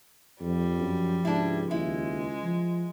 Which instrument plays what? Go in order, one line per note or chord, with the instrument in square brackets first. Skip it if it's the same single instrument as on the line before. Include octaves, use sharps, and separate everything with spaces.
[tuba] F2 [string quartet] F3 G3
[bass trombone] F#2
[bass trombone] C#2 [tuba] G#2 [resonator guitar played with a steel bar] D4 E4
[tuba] D#2 [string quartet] G#3 [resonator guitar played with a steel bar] E4
[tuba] F3